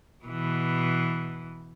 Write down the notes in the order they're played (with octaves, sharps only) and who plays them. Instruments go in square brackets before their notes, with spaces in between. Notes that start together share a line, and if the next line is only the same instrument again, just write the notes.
[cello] B2 E3